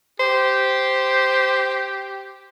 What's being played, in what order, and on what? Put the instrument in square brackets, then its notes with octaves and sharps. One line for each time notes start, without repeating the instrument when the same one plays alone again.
[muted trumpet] G4 [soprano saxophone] C5